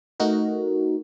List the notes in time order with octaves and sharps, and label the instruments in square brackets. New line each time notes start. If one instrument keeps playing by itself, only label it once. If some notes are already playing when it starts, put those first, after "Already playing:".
[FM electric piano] A3 D#4 F#4 A#4